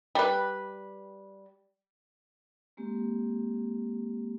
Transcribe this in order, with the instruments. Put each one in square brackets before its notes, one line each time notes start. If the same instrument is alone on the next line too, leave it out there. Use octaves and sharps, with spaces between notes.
[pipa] G3 B4
[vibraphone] G#3 A#3 C4 G4